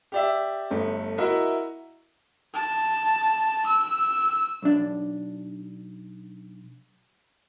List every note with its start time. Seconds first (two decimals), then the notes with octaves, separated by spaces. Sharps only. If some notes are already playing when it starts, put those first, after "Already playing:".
0.12 G4 D5 E5
0.71 G1 A3
1.18 E4 F#4 A#4 D#5 E5
2.55 A5
3.67 E6
4.62 B1 D4